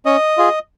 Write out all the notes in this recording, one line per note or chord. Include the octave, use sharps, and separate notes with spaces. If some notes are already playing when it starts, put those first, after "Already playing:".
C#4 D#5
F4 G#4